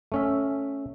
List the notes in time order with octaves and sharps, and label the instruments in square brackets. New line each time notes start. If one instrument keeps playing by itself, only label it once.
[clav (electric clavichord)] A3 C#4 E5